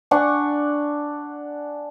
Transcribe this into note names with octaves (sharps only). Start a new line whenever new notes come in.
D4 F#5 G#5 C#6